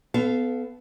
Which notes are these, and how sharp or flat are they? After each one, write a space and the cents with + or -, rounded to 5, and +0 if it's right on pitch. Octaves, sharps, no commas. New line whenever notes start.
B3 +20 A4 -20 F5 -10